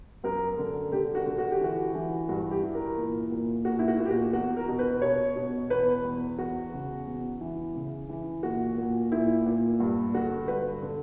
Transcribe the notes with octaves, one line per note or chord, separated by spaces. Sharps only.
F#2 A#4
D3
D3 G4
F#4
D3
F#4
G4
E3 F#4
E3
G2 F#4
G4
E3
A#4
A#2
A#2
A#2 F#4
E4
F#4
A#2
G4
F#4
E2 F#4
A#4
B2
B4
B2 C#5
B2
E2 B4
E2
E2 F#4
C#3
E2
E3
C#3
E3
A#2 F#4
A#2
A#2 E4
A#2
G2
D3 F#4
G2 B4
D3